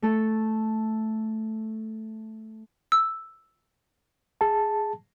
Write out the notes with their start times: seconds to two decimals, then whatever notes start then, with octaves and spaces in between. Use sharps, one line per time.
0.02 A3 A4
2.92 E6
4.41 G#4 A5